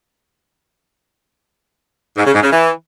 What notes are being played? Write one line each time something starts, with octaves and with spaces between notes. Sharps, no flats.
G#2
C#3
G#2
C#3
E3